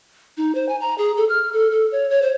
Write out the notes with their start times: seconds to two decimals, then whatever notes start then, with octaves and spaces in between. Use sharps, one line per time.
0.37 D#4
0.55 C5
0.69 G#5
0.81 A#5
0.98 G#4
1.17 A4
1.29 F6
1.53 A4
1.71 A4
1.92 C#5
2.10 C#5
2.22 C5